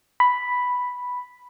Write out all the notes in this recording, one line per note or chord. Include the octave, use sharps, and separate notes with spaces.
B5